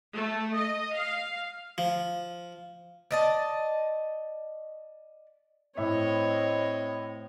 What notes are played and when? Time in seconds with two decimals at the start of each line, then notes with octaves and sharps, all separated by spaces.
0.13 A3
0.55 D#5
0.96 F5
1.78 F3
3.11 D5 D#5 A5
5.77 A2 C4 C#5 D#5 E5